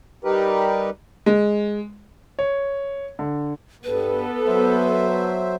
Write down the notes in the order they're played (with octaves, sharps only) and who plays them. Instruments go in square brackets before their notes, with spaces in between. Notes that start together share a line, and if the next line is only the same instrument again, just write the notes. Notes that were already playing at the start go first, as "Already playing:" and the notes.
[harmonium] G3 D#4 G4 A#4 B4
[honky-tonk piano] G#3
[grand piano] C#5
D3
[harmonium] G2 [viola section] B3 A4 [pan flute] B4
[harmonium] F#3 C5 E5